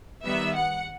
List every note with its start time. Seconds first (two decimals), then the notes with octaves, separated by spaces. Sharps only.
0.25 D#3 G3 B3 E5
0.55 F#5